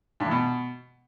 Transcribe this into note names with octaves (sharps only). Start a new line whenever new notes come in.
G2
E2
B2